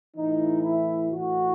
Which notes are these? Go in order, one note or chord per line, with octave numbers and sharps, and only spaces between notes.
A2 E3 D#4
E4
A2 E3 F#4